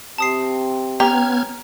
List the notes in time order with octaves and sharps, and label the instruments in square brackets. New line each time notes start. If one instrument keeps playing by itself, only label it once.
[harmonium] C3 C4 [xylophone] A5 D#6 C7
[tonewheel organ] B3 F6 G#6 [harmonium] C#4 [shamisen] G4 [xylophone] A#5